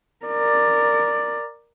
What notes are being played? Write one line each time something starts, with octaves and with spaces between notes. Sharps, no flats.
A#4 D5